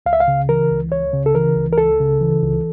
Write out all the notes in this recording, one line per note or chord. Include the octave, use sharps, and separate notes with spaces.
C#2 F5
E5
F5
C#3
E3 A#4
C#2
C#2 C#5
C#3
A4
E3 A#4
C#2
A#4
C#2 A4
C#3
E3
C#2